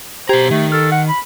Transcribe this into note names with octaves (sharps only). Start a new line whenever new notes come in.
B2 G4 C5 A#5 G#6
D#3 A3
A4 F6
F#5
B5